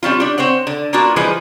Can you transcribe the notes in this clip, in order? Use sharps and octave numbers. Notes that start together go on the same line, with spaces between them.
G3 C4 C#4 F4
D4 G4
C4 C5 C#5 F#5
D3
A#3 B3 D4 F4 F#4
E3 F3 G3 G#3 G#4 B4